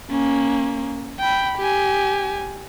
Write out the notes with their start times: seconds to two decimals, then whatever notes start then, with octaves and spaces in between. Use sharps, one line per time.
0.10 A#3 C#4
1.20 G5 B5
1.58 G4 G#5